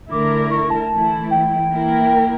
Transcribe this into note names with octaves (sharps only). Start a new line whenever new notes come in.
D3 A3 E4 A#4 D6
C#6
A5
E3 A3 E4
G5
E3 A#3 E4 A#4